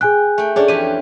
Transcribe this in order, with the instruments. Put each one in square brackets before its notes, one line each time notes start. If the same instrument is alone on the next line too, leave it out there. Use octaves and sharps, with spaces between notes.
[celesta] G#4 G#5 F#6 [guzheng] G5
[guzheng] A3 G5
[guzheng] C#4 D4 [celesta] G#4 D5
[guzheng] F2 E3 G4 [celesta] D#7